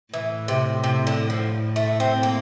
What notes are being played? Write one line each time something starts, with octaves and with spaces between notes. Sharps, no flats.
A2 E3
C3
C3
D3
F3
A3
C4
A#3